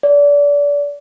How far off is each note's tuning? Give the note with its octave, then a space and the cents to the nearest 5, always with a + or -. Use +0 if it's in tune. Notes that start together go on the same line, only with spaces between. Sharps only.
D5 -30